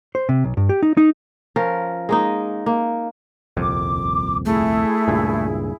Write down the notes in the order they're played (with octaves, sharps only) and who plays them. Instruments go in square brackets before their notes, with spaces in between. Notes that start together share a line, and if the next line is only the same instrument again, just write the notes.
[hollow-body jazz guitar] C5
C3
B1
G2
G4
D#4
D#4
[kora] F3 C#4 A#4
G#3 A#3 D#4
A#3
[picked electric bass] D#1 C2 F2 [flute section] D6
[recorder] A3 [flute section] E4 G#4
[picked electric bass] C#2 G2 A#2